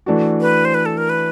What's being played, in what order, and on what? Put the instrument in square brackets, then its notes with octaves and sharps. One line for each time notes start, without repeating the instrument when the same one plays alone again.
[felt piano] E3 A3 D4 F#4
[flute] B4
C5
B4
A4
A#4
B4